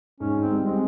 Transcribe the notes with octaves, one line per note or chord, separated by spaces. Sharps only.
G#2 C#4
D#4
C4
G3
G#3 C4